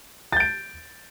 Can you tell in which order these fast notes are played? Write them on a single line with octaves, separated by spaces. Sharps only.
A6 G6 D7